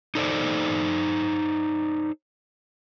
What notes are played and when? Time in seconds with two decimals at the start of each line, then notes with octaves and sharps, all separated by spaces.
0.15 D#4 A4 C5 D5